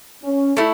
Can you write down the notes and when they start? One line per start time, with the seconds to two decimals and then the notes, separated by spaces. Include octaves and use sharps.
0.23 C#4
0.57 A3 E4